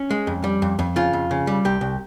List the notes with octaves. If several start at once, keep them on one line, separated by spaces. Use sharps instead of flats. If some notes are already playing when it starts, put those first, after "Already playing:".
Already playing: C#4
G#3
F2
G3
F2
F2
C#3 F4
F2
C#3
G3
C2 G4
C2